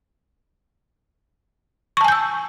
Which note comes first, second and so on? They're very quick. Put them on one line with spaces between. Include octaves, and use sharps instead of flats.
C#6 A5 G#5 G6 E6